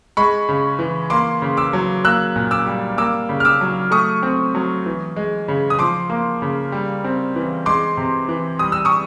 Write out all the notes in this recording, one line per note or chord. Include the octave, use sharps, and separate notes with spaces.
G#3 B5 C#6
C#3
E3
A#3 C6 D6
C#3
D6 E6
F#3
A#3 E6 F#6
A#2
D6 E6
G3
A#3 D6 E6
C#3
F6
D6 E6
F#3
A3 C#6 D#6
C4
F#3
E3
G#3
C#3
D#6
F3 C6 D6
A#3
C#3
G3
C4
E3
G#3 C6 D6
C3
E3
G3 D#6
E6
C#6 D#6